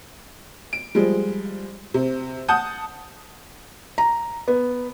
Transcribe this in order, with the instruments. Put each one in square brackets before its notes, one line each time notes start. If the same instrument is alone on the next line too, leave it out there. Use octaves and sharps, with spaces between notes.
[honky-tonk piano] D7
F3 G3 G#3
C3
F#5 A5 D#6 G6
[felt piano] A#5
B3